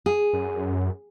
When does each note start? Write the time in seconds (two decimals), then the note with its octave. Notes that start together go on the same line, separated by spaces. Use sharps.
0.06 G#4
0.33 F#2